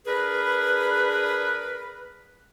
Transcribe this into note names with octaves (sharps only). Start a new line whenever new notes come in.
D4 G#4 A#4 B4